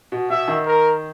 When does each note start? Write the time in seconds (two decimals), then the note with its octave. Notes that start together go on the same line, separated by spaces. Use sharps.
0.12 B2
0.30 B2 E5
0.48 D#3
0.66 A#4